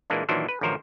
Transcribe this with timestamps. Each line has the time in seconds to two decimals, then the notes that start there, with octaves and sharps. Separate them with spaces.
0.10 A#2 E3 G#3 A#3 D4
0.29 A#2 D#3 E3 F#3 D4 C5
0.49 B4
0.61 A1 D2 F3 A#4 C5 C#5